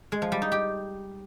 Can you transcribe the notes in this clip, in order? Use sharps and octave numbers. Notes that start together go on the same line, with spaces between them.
G#3
F3
G3
D#4
G4